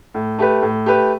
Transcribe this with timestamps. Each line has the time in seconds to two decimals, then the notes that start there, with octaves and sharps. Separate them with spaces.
0.14 A2
0.39 A3 G4 B4
0.62 A2
0.86 A3 G4 B4